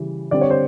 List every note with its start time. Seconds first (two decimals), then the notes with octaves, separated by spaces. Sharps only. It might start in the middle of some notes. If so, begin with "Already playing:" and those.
Already playing: C#3 E3 G3
0.31 D3 G3 C4 D5
0.41 C#5
0.50 C5